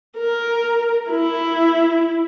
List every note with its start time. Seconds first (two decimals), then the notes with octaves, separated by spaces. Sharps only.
0.18 A#4
1.10 E4